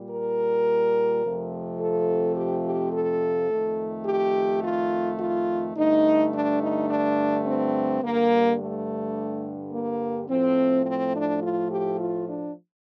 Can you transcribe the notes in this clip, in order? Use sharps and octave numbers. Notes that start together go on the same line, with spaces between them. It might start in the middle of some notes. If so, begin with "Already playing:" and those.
Already playing: A#2 G3
A#4
F2 C3 F3 A3
A4
G4
G4
A4
F2 D#3 A3
G4
F4
F4
G2 D3 A3 D#4
D4
D#4
D4
C4
G2 D3 G3 A#3
A3
A#3
A2 F3 A3 C4
C4
D4
F4
G4
F4
D4